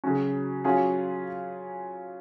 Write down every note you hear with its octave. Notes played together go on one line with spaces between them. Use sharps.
C#3 F#3 C#4 F#4
F#3 C#4 F4 G#4